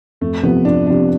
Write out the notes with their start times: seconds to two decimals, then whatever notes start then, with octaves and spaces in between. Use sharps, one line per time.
0.21 F2 A3
0.43 C3 F3 B3 C4 G4
0.65 F2 D4
0.86 C3 F3 C4 D4 G4